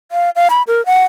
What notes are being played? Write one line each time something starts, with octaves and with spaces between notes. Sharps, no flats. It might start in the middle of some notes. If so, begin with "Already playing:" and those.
F5
F5
B5
A#4
F#5